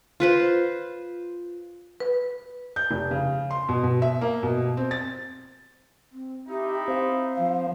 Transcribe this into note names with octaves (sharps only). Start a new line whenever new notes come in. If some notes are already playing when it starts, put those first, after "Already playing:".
F4 B4 C5
B4
G6
F1
C#3
C6
B2
B2
E5
A#3
B2
C4
A6
C4
D#4 E4 G4 E5
C4 C5 F5
F3